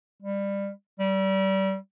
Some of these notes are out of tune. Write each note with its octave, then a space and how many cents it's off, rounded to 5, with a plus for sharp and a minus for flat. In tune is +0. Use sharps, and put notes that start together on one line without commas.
G3 +20
G3 -30